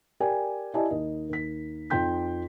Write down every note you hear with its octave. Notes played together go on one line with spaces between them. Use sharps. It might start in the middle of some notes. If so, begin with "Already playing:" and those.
G4 A#4 D5 G5 G#5
E4 G4 D5 D#5 G#5 A5
D#2 D#5
D#2 B6
F2 D#4 G5 C6 G6 B6